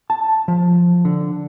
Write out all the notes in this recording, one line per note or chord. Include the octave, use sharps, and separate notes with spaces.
A5
F3
D3